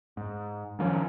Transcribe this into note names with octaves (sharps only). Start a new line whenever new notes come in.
G#2
D#3 F3 A3 C#4